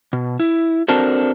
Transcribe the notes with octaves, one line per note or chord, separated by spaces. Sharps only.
B2
E4
C4 D4 F#4 A4 A#4 C5